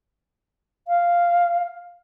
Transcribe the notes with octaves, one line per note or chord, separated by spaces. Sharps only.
F5